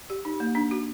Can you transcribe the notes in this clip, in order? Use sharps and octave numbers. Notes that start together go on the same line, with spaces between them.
G4
D#4
A#3
D4
F#4